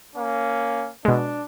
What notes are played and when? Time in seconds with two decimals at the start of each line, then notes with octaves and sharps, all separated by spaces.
0.16 A#3 C#4
1.05 B2 G#3 D4